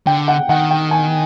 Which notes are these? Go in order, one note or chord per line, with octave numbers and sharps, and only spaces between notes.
D3 G5
F#5
D#3 F#5
G5
G#5